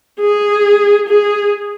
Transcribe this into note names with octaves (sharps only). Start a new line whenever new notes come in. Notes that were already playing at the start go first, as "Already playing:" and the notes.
G#4
G#4